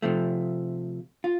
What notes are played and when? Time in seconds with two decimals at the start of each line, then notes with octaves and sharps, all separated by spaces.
0.02 C3 F3 A3
1.24 F4